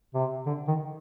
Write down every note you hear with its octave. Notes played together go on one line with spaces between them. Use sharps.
C3
D3
D#3